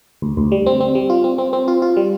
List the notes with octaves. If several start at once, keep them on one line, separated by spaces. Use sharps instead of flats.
D2
D2
G3
C4
C4
G3
F4
C4
C4
C4
F4
F4
G3